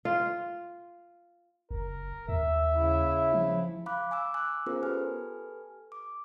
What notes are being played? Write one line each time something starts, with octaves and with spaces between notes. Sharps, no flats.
F4
F#1 A#4
D#2 E5
C#3 E4
F3
F5 B5 D6 F#6
G#5 D6 E6
G#5 D6 E6 F#6
B3 C#4 F4 G#4 A#4 C5
G4 A4 B4 G#5 F6
D6